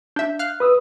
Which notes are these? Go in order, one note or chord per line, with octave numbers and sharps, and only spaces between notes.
D4 E5 G6
F5 F6 F#6
B4 D#6 E6